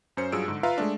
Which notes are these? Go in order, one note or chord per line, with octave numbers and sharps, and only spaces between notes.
F#2 C#4 C5 C#7
G2 F#3 F4 G#4 E6 D7
G#2 D3
F4 B4 E5 F5 A#5
G#3 A3 D4